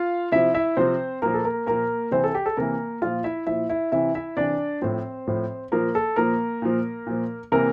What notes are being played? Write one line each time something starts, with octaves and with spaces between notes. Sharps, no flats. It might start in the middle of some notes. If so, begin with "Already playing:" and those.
Already playing: F4 F5
C3 F3 E4 E5
E4 E5
C3 F3 C4 C5
A#2 F3 A#3 A#4
A4
A#3 A#4
A#2 F3 A#3 A#4
C3 E3 C4 C5
A4
G4
A4
C3 E3 A#3 A#4
A#2 F3 F4 F5
E4 E5
A#2 F3 E4 E5
E4 E5
C3 E3 E4 E5
E4 E5
C3 E3 D4 D5
A2 F3 C4 C5
A2 F3
A#2 F3 A#3 A#4
A4
A#2 F3 A#3 A#4
A#2 F3
A#2 F3
C3 E3 A#3 A#4